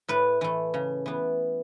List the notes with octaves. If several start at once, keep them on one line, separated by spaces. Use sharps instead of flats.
A2 B4
E3 A3
C#3
E3 B3